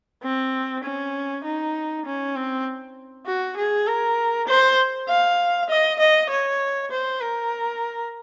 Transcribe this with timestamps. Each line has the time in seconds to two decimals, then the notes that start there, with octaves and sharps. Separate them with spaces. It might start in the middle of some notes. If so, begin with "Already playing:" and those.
0.23 C4
0.84 C#4
1.44 D#4
2.05 C#4
2.36 C4
3.26 F#4
3.57 G#4
3.87 A#4
4.48 C5
5.08 F5
5.70 D#5
6.00 D#5
6.30 C#5
6.91 C5
7.20 A#4